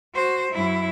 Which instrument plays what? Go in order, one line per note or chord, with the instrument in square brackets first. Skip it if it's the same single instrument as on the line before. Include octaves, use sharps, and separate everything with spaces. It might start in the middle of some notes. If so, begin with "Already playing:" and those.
[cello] F#4 C5
F#2 E4